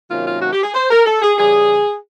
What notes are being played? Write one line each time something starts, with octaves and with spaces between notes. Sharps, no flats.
C3 D#3 F#3 A#3 C#4 F4
F4
F#4
G4
G#4
C5
A#4
A4
G#4
C#3 E3 G3 G#4